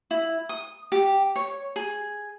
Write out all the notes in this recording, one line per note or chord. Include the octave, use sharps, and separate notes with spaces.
E4
D#6
G4
C#5
G#4